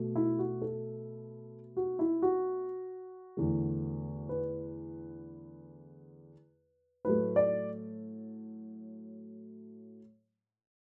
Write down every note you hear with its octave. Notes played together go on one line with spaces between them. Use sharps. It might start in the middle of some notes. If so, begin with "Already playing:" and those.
Already playing: B2 A3
E4
F#4
A4
F#4
E4
F#4
E2 D3 A3
B4
A2 F#3 A3 B4
D5